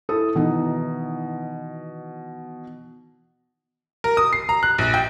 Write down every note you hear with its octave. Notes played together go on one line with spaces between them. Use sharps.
E4 A4 D#6
B2 D#3 E3 D#4
A#4
D#6
C7
A#5
F#6
A#1
G5